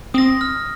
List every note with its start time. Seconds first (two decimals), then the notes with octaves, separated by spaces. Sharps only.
0.14 C4 D#6 A#6
0.41 F6